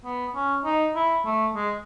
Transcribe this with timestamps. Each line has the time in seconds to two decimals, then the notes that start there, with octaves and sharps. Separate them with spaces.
0.05 B3
0.35 C#4
0.65 D#4
0.95 E4
1.25 A3
1.55 G#3